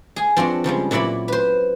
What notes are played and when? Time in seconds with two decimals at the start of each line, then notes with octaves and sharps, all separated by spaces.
0.16 G#4 G#5
0.37 F3 C4 D4 F#4
0.64 C#3 F3 G3 G#3
0.91 A#2 F#3 E4 D5 B5
1.28 B4 C5